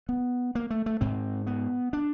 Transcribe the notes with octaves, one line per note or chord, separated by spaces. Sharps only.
B3
A#3
A3
A3
G#2 C4
B3
D4